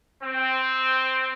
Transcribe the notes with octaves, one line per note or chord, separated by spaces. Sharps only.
C4